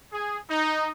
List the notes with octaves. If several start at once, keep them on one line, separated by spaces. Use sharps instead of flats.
G#4
D#4